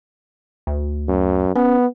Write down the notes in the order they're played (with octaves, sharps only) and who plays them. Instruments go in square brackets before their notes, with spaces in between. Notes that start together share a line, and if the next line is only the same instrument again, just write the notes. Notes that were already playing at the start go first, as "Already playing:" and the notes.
[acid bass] D2
[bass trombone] F#2
[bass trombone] B3 [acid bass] C#4